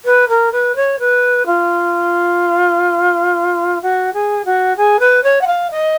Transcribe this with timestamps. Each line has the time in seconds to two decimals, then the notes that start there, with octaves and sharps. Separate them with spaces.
0.05 B4
0.28 A#4
0.52 B4
0.75 C#5
0.99 B4
1.46 F4
3.82 F#4
4.13 G#4
4.45 F#4
4.76 G#4
4.99 B4
5.23 C#5
5.41 F#5
5.46 F5
5.70 D#5